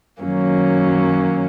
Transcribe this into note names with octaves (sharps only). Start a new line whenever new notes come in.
F#2 D#3 F#3 A#3 C#4